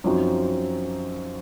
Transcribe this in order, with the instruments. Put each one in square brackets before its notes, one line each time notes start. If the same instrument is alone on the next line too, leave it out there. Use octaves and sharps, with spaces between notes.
[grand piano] F#2 F3 C4 D#4 F#4